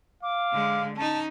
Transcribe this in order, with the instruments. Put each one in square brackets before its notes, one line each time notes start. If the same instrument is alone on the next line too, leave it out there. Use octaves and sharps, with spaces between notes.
[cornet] F5 [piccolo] D6
[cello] D3 G#3
[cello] C#4 D#4 [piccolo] A5